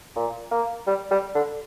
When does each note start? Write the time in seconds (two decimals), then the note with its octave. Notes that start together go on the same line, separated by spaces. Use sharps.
0.16 A#2
0.51 A#3
0.87 G3
1.11 G3
1.35 D3